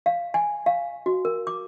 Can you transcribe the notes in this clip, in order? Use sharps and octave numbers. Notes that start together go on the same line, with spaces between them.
F5
G#5
F5
F#4
A#4
D6